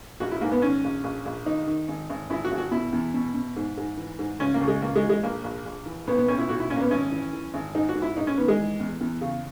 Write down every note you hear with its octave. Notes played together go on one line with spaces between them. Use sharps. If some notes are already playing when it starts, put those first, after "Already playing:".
A#1 F#4
E4
G#2 A#3
B3
D#3 C#4
A#1
A#1
A#1
D#3 D#4
D#3
G#1
G#1
G#1 E4
F#4
G#1
F#4
B2 E4
E2
B2
B2
G#2
G#2
E3
G#2
C#2 C#4
A#3
C#2
G#3
C#2 A#3
G#3
E3
G#3
A#1 A#3
A#1
A#1
E3
B1 B3
B3
B1 C#4
E4
B1 F#4
E4
A#2 C#4
A#3
B3
G#1 C#4
E3
E3
G#1
G#2 D#4
F#4
G#2
E4
A#1 D#4
C#4
D#3 B3
G#3
E3
E2
E2
C#3